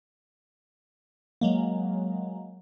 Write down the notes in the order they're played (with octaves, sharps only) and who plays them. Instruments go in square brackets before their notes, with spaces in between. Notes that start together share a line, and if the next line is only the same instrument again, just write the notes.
[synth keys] F#3 G#3 A#3